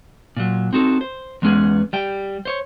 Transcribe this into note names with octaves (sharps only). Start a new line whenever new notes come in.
A#2 F#3
C4 D#4 F#4 A4
C5
E2 G#3 B3 C#4 G#4
G3 G5
C5 C#5